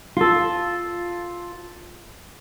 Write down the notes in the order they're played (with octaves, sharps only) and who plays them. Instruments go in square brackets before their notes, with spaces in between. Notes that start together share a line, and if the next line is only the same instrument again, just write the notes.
[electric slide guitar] F4 A4